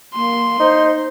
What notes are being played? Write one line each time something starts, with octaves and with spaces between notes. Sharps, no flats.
A#3 C6
D#4 C5